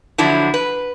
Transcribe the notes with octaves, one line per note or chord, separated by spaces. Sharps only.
D3 F3 F#3 D4 E4
B4